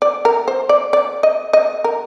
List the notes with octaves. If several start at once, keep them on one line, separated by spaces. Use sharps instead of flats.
D5
A#4
C5
D5
D5
D#5
D#5
A#4